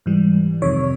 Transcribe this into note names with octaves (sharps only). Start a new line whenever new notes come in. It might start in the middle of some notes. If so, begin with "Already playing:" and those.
G#2 E3 G3
F2 C3 D#3 C#5